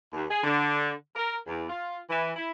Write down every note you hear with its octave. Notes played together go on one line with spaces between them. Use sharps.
D#2
G#4
D3
A#4
E2
F4
E3
E4